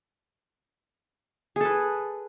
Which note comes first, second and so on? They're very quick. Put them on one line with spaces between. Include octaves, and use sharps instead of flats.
G#4 A4 B4